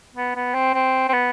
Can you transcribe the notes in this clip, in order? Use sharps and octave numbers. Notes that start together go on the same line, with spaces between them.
B3
B3
C4
C4
C4
B3